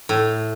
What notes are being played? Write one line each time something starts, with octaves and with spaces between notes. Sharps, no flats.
A2